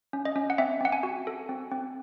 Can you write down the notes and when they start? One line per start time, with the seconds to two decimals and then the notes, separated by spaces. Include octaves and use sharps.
0.13 C#4
0.25 D#5
0.36 C#4
0.50 F#5
0.58 C4 E5
0.81 C4 F#5
0.92 G#5
1.03 F#4
1.27 A4
1.49 C4
1.71 C4